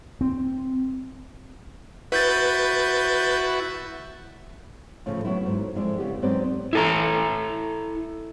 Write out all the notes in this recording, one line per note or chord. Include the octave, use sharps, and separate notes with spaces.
C4
E4 F#4 B4 G6 A6
A2 C#3 F3 A3
F#3 A3 B3 C#4 E4
G#2 F#3
F2 G#3 E4 D5
C#3 B3 G4
G#2 F#3 B3 C4 B4 D5
E4 A4 A#5